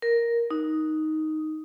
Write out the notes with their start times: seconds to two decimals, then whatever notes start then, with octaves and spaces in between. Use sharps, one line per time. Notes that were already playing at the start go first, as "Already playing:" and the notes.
0.02 A#4
0.51 D#4